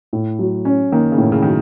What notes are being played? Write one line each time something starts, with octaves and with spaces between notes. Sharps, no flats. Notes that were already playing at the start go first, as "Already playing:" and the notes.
A2
F#3
C#4
D#3 A#3
C#3
A2
C#3
D#3 F#3